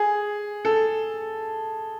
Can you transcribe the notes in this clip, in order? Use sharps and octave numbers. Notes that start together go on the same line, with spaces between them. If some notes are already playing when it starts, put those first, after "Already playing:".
Already playing: G#4
A4